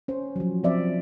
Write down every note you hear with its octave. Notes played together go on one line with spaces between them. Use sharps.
C#4 C5
F3 F#3
F3 C4 D5 E5